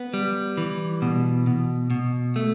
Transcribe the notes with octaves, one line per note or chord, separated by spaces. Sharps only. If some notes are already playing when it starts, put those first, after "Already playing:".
Already playing: B3
G3
E3
B2
B2
B2
A3